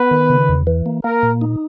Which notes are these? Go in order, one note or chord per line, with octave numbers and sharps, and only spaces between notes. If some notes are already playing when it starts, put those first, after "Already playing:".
Already playing: B3 B4
D#3
C#3
E2
E3
A#3
A#3 A#4
A#2
D#4